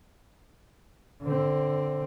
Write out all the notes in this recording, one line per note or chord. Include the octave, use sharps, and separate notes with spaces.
D3 C4